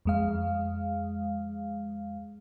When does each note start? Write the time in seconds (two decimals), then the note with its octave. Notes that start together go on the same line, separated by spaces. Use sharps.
0.05 F2 G#3 F5